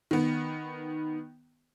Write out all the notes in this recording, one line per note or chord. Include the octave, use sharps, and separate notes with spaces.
D#3 B3